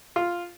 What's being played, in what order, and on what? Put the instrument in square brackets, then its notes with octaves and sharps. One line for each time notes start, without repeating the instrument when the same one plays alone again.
[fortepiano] F4